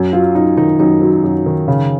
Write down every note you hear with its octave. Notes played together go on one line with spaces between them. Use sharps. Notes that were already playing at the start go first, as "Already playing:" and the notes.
Already playing: F#2
F#3 F4
F#2 D#4
D#3 D#4
F#2 D#4
F#3
F#2
D#3
C#3